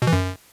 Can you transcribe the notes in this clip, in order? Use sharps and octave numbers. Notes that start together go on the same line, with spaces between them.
B2
E3
F#2